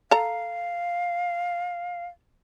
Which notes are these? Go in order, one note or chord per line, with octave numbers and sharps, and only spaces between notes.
A4 F5 A#5